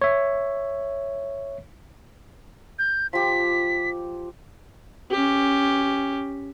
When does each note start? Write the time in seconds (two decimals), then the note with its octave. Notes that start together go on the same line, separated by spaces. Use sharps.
0.02 C#5 E5
2.79 G6
3.13 F3 G4 B6
5.11 C#4 G4